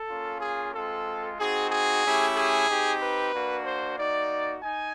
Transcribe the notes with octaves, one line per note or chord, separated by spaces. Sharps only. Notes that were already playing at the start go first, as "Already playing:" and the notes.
Already playing: A4
A#3 C#4 F4
G#4
G#3 C4 F4 A4
C4 D#4 F#4 G#4
G#4
A3 C#4 E4 G4
G#4
C4 D#4 G4
B4
A#3 D4 F#4
C5
A#3 D#4 F#4 D5
D#4 G#5